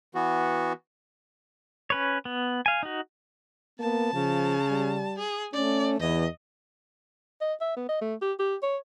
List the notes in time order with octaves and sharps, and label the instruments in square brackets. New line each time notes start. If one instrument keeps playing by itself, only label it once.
[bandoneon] E3 B3 F#4
[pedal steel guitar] C#4 B4 C#5
B3
F5 G#5
D#4 F#4
[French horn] A#3 [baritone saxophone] B3 [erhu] A5
[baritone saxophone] C#3 [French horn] F3
[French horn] G3
[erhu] G#4
[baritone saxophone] A3 [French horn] C#4 [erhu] D5
[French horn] E2 [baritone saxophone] E3 [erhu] D#5
[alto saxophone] D#5
E5
B3
D#5
A3
G4
G4
C#5